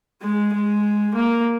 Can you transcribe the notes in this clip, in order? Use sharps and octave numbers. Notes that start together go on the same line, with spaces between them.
G#3
G#3
A#3